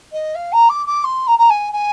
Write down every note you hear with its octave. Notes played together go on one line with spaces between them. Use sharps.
D#5
F5
A#5
D6
D6
C6
A#5
A#5
G#5
G#5